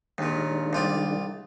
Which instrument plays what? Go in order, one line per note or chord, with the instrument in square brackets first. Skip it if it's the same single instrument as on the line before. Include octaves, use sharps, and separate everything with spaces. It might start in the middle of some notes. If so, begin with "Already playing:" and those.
[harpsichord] D#2 A#2 [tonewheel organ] D#3 G#3 D4
[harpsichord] C2 F4 D5